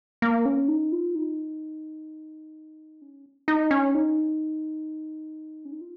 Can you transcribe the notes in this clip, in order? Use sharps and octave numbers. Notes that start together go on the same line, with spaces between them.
A#3
C#4
D#4
F4
D#4
C#4
D#4
C#4
D#4
C#4
D#4
F4